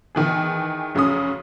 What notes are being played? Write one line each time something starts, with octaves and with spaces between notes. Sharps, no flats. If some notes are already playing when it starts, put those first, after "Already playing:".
D#3 E3 G#4
F1 C#3 F#3 C#4 D#6